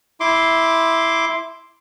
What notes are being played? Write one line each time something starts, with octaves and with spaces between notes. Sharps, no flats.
E4 C6 D6